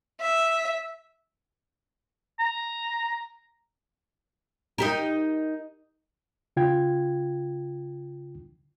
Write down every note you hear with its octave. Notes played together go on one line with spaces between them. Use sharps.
E5
A#5
D#4 G4 A#4
C#3 F4 G5 G#6